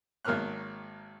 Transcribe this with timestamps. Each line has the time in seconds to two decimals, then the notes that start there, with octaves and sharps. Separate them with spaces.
0.25 G#1 D#3 F#3 A#3 F6 F#6